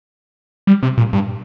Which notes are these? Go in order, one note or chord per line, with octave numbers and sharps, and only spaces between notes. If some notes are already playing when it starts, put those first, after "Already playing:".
G3
C3
A#2
G2